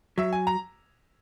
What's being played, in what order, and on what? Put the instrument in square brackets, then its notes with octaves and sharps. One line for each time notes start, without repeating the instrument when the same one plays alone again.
[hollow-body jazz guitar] F#3 [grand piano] E5
[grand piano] G#5
A#5